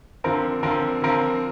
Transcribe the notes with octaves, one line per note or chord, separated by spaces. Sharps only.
D3 F3 C4 A#4
D3 F3 C4 A#4
D3 F3 C4 A#4